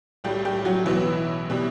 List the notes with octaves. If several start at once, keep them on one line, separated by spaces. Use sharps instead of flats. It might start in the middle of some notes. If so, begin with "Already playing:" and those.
B1 A2 F#3 G3 G4
G3 G4
F#3 F#4
B1 B2 E3 F#3 B3 E4
B2 G3